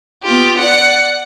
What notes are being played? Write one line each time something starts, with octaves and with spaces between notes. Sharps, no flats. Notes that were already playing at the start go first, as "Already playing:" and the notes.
B3 F4 G4
D5 F#5